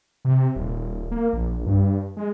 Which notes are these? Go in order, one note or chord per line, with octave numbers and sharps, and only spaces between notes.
C3
D#1
A#3
A#1
G2
G#3